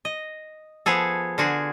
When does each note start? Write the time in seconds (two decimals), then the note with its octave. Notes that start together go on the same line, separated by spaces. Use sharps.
0.05 D#5
0.86 F3 B3 G#4 A4
1.38 D3 F4 F#4 G#4